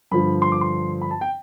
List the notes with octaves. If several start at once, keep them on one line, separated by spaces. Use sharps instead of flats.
G2 D3 F3 B5
C6
D6
C6
B5
A5
G5